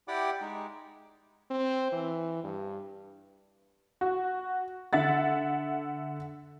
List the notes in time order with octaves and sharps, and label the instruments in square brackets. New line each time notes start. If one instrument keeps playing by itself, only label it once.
[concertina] E4 G4 D5 F#5 G5 D6
G#3 D#4
[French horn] C4
E3
G2
[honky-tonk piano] F#4
D3 E5 F#5 A6